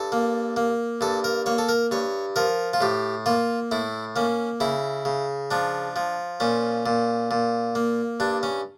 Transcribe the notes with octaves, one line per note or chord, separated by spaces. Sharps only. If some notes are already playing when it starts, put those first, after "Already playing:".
Already playing: G2 A4
A#3
A#3
G2 A4
A#4
A#3 C#5
A4
A#4
G2 C#5
F3 A#4
F4
A2 G4
A#3 F4
A2 E4
A#3 C#4
C#3 E4
C#3
F3 D4
F3
A#2 C#4
A#2
A#2
A#3
G2 D4
C#4